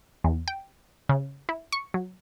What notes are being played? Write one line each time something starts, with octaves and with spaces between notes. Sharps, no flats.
E2
G5
C#3
E4
C#6
F#3